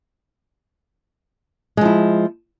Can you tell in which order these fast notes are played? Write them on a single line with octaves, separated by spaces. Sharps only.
G#3 F3 E4